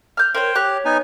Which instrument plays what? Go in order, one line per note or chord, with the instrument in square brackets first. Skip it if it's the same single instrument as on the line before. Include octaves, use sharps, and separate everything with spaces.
[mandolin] F6 G6
[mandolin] A#4 C#5 [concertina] C5 G5
[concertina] G4 [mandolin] C#5 F#6
[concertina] B3 D#4 G#5